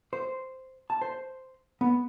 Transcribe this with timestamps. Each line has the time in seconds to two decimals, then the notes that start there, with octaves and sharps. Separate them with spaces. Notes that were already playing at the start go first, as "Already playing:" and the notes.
0.13 C5
0.90 A5
1.02 C5
1.81 B3